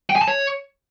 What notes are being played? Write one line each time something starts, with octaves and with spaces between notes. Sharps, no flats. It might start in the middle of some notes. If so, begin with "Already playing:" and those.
G5
G#5
A5
C#5